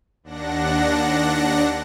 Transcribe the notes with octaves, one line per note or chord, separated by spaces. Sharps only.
D#2 D4 F#5 A#6